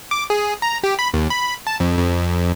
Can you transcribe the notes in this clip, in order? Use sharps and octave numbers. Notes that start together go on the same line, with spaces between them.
D6
G#4
A#5
G4
B5
D#2
B5
A5
F2
F2